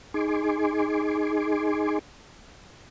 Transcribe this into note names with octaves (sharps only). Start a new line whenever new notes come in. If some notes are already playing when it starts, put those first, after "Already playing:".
D#4 G#4 G#5 C6 D6